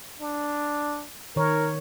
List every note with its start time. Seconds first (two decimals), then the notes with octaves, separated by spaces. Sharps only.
0.21 D4
1.36 D#3 A#4 C#5